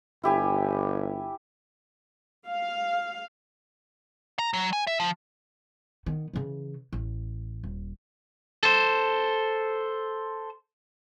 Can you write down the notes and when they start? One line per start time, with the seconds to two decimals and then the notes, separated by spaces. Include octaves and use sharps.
0.23 G1 E4 G4 G#5
2.48 F5
4.39 A#5
4.54 F#3
4.73 G#5
4.87 E5
5.00 F3
6.06 D#3 B3
6.33 C#3 E3
6.93 A1
7.64 D#1
8.63 A4 C5